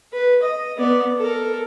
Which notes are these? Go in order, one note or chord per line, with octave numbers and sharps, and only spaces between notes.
B4
D#5
B3 D5
A4 A#4